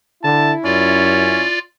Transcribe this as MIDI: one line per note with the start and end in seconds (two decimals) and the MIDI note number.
0.24 0.53 50
0.24 1.54 64
0.24 0.54 81
0.64 1.43 42
0.64 1.45 61
0.64 1.59 65
0.64 1.59 74